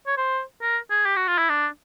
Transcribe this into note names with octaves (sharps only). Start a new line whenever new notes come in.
C#5
C5
A#4
G#4
G4
F#4
F4
E4
D4